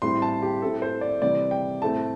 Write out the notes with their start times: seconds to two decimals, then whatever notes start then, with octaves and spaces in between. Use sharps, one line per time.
0.02 A2 G3 C4 C6
0.22 A5
0.42 G4
0.62 A2 A3 C4 A4
0.82 C5
1.01 D5
1.21 C3 E3 G3 C4 D5
1.51 G5
1.81 A2 A3 C4 A5